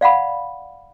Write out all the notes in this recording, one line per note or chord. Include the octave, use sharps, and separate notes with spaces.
D5 F5 F#5 B5